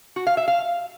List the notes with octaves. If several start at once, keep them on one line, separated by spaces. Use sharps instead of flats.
F#4
F5
E5
F5